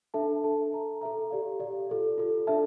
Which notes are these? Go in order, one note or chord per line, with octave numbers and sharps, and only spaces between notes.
D4 A4 E5 A5
D4 A4 E5 A5
A4 E5 A#5
A4 E5 A#5
G4 D5 F5
G4 D5 F5
F4 A4 D5
F4 A4 D5
D4 A4 E5 A5